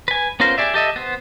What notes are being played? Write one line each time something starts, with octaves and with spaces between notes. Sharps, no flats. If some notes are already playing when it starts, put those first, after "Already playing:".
B4 G#5
B3 C#4 F4 A#4 C5
G4 G#4 D5 E5
G4 A4 D#5 E5
B3 C5